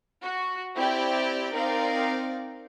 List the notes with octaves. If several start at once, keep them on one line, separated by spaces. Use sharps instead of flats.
F#4
C4 E4 G4 D5 G5
C4 D#4 A#4 D5 F5